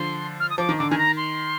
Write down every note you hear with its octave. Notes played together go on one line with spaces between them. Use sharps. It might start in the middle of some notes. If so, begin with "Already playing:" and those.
Already playing: D3 F3 C6
F6
D#6
F3 D6
D#3
D3 D6
D#3 G#5
A#5
C6